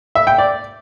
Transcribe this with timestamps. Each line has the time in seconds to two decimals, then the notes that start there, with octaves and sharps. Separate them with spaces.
0.15 E5
0.27 G5
0.38 D5